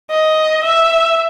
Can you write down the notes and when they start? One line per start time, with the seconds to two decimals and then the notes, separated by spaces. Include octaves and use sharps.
0.11 D#5
0.64 E5